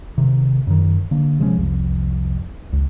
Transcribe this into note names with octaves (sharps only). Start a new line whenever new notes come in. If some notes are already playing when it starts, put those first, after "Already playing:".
C3 D#3
F#2 D#3
D3 A#3
C3 F3 G#3 C#4
C2 F2
C#2